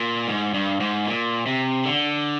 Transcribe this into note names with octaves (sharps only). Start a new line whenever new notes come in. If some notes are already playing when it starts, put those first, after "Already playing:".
Already playing: A#2
G#2
G2
G#2
A#2
C3
D3